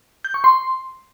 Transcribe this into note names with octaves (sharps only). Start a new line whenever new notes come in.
G6
C#6
C6